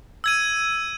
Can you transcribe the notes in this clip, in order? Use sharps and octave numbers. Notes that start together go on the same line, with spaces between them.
E6 G#6 D#7